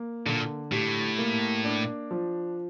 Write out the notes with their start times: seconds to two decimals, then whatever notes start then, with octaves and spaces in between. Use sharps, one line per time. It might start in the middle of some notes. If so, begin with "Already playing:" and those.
Already playing: A#3
0.26 A#2 D3
0.72 A2 G4
1.19 A#3
1.64 D4
2.11 F3